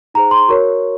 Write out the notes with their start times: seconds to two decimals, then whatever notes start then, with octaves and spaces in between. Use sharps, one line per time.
0.14 D#4 G#4 C5 A#5
0.31 C6
0.48 F#4 A#4 C#5 C#6